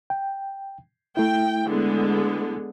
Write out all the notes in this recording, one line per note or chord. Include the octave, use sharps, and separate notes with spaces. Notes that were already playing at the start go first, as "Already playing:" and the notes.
G5
A3 E4 G5
D3 G#3 B3